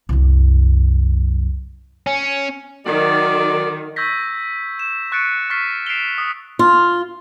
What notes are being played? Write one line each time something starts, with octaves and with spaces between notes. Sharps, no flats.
C2 F#2
C#4
D#3 F#3 F#4 D5
C#6 E6 G6 G#6 A#6 B6
E7
C#6 F#6 A6 C#7 D7
C#6 F6 A6 B6 C7
C7 D7 E7 F7 G7
D#6 B6
F4